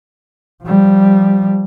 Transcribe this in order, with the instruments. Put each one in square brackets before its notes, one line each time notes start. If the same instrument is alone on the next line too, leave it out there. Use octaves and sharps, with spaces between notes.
[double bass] F3 G3